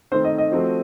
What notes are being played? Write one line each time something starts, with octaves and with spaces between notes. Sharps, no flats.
D#3 A3 C4 C5
D#5
D#5
F3 A3 C4 F#4 C5